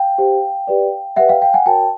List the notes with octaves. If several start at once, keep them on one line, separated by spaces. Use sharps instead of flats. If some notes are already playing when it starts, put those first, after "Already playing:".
Already playing: F5 G5
G4 C5
G4 B4 D5
G4 B4 D5 E5 F#5
F5 G5
F5 G5
F#5 G#5
F#4 A#4 C#5 G5 A5